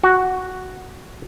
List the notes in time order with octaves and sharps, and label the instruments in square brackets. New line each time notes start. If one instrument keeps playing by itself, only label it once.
[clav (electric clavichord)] F#4